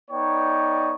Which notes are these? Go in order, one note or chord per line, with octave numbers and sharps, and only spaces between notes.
B3 D#4 C#5 D5 G5